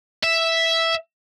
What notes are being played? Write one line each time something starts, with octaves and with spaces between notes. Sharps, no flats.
E5